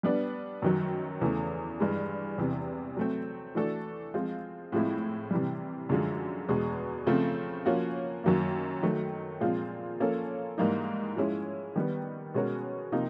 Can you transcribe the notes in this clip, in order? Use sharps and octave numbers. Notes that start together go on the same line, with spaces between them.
G3 B3 D4
F#2 D#3 F#3
E2 C#3 E3 A3
G2 E3 G#3
E2 C3 E3
F#3 A3 C4
E3 A3 D4 F#4 A4
F3 G#3 C4 F4
A2 F3 G#3 C4 E4
C3 E3 G3
F#2 D3 F3 G#3
E2 B2 G#3
C#3 F3 A3 C4
F3 A#3 C#4 F#4
F#2 D#3 F#3 A#3
D#3 F#3 A3
A#2 F3 G#3 C4 F4
F3 A#3 C#4 F4 A4
G#2 E3 G3 A#3 D#4
F3 G#3 C#4 E4
D#3 G3 B3
B2 G#3 C#4 F#4 A#4
C3 F3 A#3 D#4